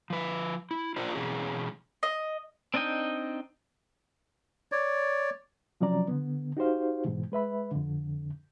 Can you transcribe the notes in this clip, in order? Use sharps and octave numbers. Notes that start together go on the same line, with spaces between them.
F3 B4
E4
D4 F4 A#4 C5
B2 E3 C#4 G#4
D#5
C4 D4 D#4 D#5 G5
C#5 D5
C3 F3 F#3 C#4 D5 A#5
D3 B3
D#4 F#4 G4 C5 F5
G#2 B2 E3
G#3 B4 E5 B5
F2 D3